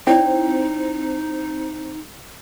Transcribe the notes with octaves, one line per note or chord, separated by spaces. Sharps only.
C4 D#4 E4 C#5 D5 G5